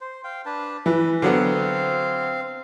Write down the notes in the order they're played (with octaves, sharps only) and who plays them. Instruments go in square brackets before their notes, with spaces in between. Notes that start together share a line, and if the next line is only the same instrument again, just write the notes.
[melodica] C5
F5 G5
D4 B4 A5
[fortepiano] E3 [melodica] B4
[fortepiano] D3 F#3 B3 [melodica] C4 F5